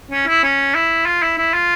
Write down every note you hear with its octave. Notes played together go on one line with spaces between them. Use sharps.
C#4
E4
C#4
E4
F4
E4
E4
F4